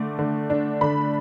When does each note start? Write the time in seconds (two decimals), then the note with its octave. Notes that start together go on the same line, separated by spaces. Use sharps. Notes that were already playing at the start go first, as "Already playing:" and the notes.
Already playing: D3 A3 D6
0.19 D3
0.50 D4
0.81 D3 B5